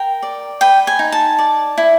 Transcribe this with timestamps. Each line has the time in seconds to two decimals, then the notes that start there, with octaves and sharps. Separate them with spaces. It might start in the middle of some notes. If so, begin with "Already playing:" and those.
Already playing: A#4 G5
0.23 D5
0.61 B4 G5
0.87 G#5
0.99 D#4
1.12 A5
1.38 D5
1.78 E4